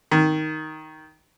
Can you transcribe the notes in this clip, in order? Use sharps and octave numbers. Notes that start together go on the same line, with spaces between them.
D#3